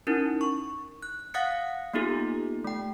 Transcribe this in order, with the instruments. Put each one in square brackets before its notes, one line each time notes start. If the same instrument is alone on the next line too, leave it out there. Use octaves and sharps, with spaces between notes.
[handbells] C#4 D#4 E4 A#4
C#6
F#6
F5 F#5 D#6 F#6 A6 C#7
A#3 B3 D#4 F4 G4 A4
A3 G5